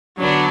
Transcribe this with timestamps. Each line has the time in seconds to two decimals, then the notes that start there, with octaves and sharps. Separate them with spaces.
0.18 D3 F#3 B3 D4